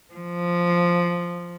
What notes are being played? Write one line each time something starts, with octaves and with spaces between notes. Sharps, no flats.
F3